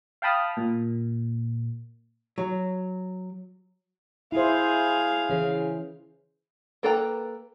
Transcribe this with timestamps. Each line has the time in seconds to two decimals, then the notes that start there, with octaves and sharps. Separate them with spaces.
0.22 F5 G5 A5 B5 D#6 F6
0.57 A#2
2.38 F#3
4.32 E4 G#4 C5 F5
5.30 C#3 E3
6.83 A#3 A4 B4 G5 A#5